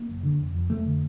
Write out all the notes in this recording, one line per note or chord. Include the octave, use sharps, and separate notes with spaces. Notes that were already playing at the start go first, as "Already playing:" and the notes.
Already playing: A#3
F#1
D3
F1
F2
F1 A3
D3